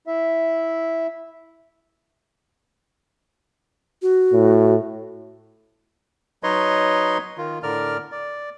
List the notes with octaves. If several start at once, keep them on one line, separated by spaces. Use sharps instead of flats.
E4 E5
F#4
A2
F#3 D#4 B4 C#5 D#5 C6
D#3 F4
A2 D3 A#4 D5 F6
D5